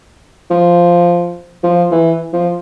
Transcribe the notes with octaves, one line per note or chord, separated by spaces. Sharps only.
F3
F3
E3
F3